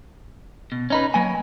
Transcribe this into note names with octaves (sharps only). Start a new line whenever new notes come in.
B2
C#4 D#4 B4
F#3 A#3 G#5